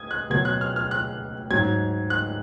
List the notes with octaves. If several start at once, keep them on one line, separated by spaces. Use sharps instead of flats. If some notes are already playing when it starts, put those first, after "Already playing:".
Already playing: D#6 G#6
F#6
B2 F#3 G#6
F#6
F6
F6
F#6
G#2 F#3 G#6
F#6